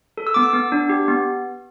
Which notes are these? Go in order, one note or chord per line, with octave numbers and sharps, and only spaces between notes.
A4
E6
B3 D6
E6
B3
D4
G4
B3